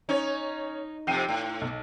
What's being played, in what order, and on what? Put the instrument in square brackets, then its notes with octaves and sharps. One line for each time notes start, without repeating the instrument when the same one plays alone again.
[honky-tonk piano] C#4 C#5 [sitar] D#4
[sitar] F2 C3 [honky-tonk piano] G5 C7 D#7
[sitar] A2
[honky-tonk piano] B1